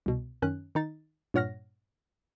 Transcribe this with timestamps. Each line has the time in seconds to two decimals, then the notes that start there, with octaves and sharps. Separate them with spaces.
0.06 C2 B2
0.42 F#2 D#3 C#4 F#6
0.75 D#3 D#4 A6
1.34 G2 A#2 C#5 F#5 F6 A#6